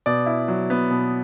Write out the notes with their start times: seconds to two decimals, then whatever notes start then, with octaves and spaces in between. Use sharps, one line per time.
0.06 B2 D5
0.26 E4
0.48 F#3
0.70 B3
0.90 B2